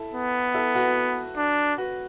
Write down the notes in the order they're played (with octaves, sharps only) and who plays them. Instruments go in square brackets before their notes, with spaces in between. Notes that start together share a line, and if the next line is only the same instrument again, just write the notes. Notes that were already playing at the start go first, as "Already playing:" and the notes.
Already playing: [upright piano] E4 A4
[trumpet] B3
[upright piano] E4 A4
F#4 B4
[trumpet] D4
[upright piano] F#4 B4